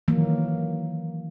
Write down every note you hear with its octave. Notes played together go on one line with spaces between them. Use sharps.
D#3 E3 F#3 A#3